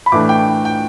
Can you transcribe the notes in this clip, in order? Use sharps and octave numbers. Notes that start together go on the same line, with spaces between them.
B5
A2 E3 A3 D4 D6
G5
G5